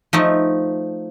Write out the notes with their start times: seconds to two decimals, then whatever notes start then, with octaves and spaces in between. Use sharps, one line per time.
0.13 F3 A3 D#4